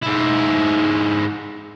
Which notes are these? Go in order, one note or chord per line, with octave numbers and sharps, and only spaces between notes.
G#2 E4